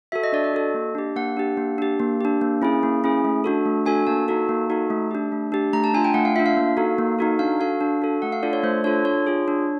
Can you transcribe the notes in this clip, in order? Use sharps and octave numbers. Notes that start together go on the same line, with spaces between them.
F#4 A4 E5
D#5
D4 D5
D#5
F#4 A4
A#3
D4 G4
A#3 F#5
D4 G4
A#3
D4 G4
A#3
D4 G4
A#3
C#4 E4 G#4
A#3
C#4 E4 G#4
A3
D4 F#4 A4
A3
D4 F#4 A4 G#5
A#3 A5
D#4 F#4 A4
A#3
D#4 F#4 A4
A3
D4 G4
A3
D4 G4
A3 A#5
A5
D4 F4 G#5
G5
A3 F#5
F5
D4 F4 E5
F5
A#3
D#4 F#4 A4
A#3
D#4 F#4 A4
D4 F5
F#4 A4 F5
D4
F#4 A4
A3 F#5
F5
D4 F4 A4 D5
C#5
A3 C5
D4 F4 A4 C#5
D4 C#5
F4 G#4
D4